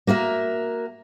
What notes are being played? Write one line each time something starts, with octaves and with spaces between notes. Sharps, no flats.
A#3 F#4 A#4 E5